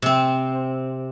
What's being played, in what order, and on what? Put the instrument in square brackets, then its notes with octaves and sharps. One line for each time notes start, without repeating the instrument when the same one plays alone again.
[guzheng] C3 C4